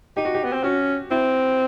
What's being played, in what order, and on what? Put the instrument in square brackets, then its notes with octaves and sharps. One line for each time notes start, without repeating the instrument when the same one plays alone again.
[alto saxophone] D#4 [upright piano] G4
[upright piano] F#4
G4
[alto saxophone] B3
C4
[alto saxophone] C#4 [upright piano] F#4
[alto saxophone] C4 [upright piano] E4